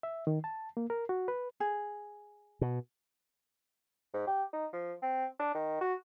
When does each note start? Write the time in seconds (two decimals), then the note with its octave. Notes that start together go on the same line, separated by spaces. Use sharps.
0.03 E5
0.27 D#3
0.44 A5
0.77 A#3
0.90 A#4
1.09 F#4
1.28 B4
1.60 G#4
2.61 B2
4.13 G#2
4.27 G4
4.53 D#4
4.73 F3
5.02 C4
5.39 D4
5.55 D#3
5.81 F#4